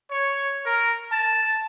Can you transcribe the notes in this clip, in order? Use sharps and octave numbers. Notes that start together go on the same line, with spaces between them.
C#5
A#4
A5